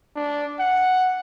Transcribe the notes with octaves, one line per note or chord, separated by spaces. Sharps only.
D4
F#5